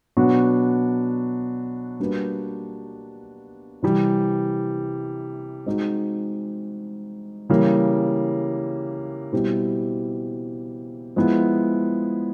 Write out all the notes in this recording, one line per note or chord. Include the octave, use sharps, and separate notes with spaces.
B2 F#3 B3 D4 F#4
G3 A#3 D4 F#4 B4
C3 E3 G3
G#3 C4 D#4 F#4
C#3 E3 G3 A#3
B2 G3 C4 E4 G4
F3 G#3 B3 E4